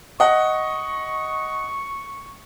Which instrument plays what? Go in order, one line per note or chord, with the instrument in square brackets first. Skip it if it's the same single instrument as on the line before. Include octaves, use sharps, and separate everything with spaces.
[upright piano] D#5 F#5 [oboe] C#6